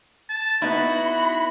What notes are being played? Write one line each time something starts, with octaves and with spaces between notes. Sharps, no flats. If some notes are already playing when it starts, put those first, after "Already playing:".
A5
B3 D#4 E4 F#4 B5